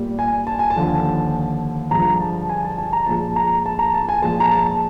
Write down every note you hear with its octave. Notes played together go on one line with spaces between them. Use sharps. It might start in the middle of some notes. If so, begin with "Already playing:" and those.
Already playing: A#2 G3 A#3
G#5
A5
G#5
A5
D#2 D3 F3
G2 D3 F3 G#3 A#5
A5
G#5
A5
A5
A#5
A#2 F3 G#3 A5
A#5
A5
A#5
A5
G#5
A#2 F3 G#3 A5
A#5
A5